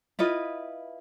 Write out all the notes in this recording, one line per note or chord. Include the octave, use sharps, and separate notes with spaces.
E4 F4 B4 D#5